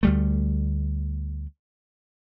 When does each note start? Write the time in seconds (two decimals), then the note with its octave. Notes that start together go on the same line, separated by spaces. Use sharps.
0.03 D2 G3 A3